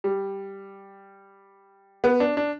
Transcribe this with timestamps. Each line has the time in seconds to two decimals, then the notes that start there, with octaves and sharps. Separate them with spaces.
0.04 G3
2.04 B3
2.20 D4
2.37 D4